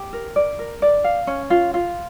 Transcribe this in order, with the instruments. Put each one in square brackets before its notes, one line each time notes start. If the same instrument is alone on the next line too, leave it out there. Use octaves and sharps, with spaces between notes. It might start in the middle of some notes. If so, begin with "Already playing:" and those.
Already playing: [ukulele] G4
A#4
D5
A#4
D5
F5
C#4
F4
F4